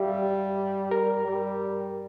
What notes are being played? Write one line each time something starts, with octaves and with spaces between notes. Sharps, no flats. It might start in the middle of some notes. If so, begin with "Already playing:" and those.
Already playing: G3 G4 E5 F5
G3 A#4
G3